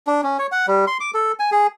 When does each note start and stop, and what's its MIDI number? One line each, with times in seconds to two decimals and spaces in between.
0.07 0.21 62
0.23 0.37 61
0.39 0.47 73
0.52 0.66 78
0.68 0.85 55
0.87 0.98 84
1.00 1.11 86
1.14 1.32 69
1.39 1.50 80
1.52 1.67 68